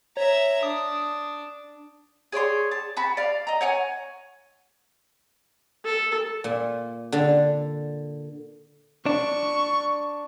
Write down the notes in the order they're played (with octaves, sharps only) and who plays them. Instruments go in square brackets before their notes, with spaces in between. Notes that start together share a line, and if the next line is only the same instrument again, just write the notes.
[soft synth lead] C#5 [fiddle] E5 A#5
[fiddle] D4 [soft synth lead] D#6
[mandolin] G#4 C#5 D5 C6
A5
F#4 A5 B5
D5 F5
D#5 A#5
C#5 F#5 G#5
[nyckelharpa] A4
[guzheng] A#2
D3
[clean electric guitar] D4 [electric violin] C#6